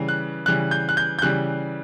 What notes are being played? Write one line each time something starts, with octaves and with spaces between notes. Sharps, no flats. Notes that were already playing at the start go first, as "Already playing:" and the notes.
Already playing: C#3 E3 G3
F#6
C#3 E3 G3 F#6
G6
F#6
G6
G6
C#3 E3 G3 F#6